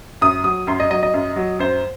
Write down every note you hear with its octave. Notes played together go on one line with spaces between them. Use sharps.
F#2 D#6
F#3 D#6
F#2 C6
D#5
F#3 D#5
D#5
F#2
F#3
F#2 C5